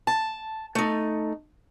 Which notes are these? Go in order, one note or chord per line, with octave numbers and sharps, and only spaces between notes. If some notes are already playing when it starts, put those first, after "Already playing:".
A5
A3 D#4